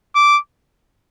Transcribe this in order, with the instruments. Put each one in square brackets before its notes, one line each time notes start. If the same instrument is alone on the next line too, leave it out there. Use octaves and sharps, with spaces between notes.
[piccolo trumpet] D6